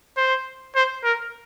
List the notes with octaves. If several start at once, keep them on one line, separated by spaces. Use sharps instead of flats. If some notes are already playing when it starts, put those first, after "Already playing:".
C5
C5
A#4